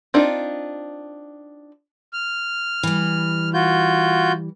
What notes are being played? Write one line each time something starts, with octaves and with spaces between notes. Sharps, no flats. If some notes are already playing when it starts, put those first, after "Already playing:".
C4 D4 D#4 F4
F6
E3 G3
F4 F#4 G6